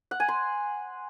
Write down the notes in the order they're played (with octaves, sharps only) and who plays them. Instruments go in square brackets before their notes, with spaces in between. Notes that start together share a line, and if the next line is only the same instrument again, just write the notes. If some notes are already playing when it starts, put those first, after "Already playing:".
[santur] F#5
G#5
C6